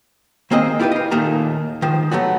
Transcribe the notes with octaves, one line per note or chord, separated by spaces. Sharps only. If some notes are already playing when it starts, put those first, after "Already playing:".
D#3 A#3 C4 G#4 D#5
E4 F4 G4 A4 B4
D#5 F5
D#2 A#2 D#3 A3 A#3 A#5
D#3 F3 G#3
F#3 A3 B3 F#4